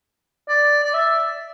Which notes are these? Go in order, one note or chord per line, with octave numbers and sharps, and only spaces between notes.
D5
D5
E5